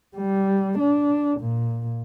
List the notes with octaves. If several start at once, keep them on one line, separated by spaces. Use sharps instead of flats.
G3
D4
A#2